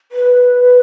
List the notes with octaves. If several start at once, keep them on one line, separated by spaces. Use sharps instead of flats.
B4